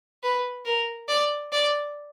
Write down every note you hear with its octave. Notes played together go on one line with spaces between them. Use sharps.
B4
A#4
D5
D5